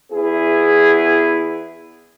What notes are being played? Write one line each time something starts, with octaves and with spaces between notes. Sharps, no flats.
E2 B3 E4 G#4